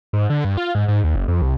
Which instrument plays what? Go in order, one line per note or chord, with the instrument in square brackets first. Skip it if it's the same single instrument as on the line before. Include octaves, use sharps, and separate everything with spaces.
[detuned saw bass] G#2
D3
G2
F4
G#2
G#2
D#2
F#1
F2
C2